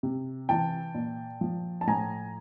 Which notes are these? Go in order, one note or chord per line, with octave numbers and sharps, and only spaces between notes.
C3
E3 G5 A5
A#2
F3
A5
A2 G#5 A#5